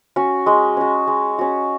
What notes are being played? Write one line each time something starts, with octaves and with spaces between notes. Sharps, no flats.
C#4 F#4
G#3
C#4 F#4
G#3
C#4 F#4